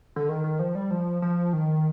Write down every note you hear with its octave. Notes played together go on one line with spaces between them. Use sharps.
D3
D#3
D#3
F3
G3
F3
F3
D#3